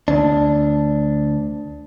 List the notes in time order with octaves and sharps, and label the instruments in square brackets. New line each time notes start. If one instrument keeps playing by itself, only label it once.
[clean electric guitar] D2 D4